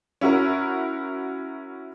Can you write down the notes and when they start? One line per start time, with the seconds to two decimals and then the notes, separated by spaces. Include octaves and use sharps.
0.21 C#4 E4 F#4 A#4